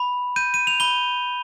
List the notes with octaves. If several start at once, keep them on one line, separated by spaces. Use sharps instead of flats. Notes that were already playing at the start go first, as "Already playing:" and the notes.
Already playing: B5
G6 D#7
D#7
F7
B5 G7